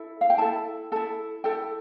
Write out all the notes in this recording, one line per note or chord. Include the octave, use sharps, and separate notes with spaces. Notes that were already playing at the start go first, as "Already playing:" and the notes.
Already playing: E4 A4
F5
G5
E4 A4 A5
E4 A4 A5
E4 A4 G5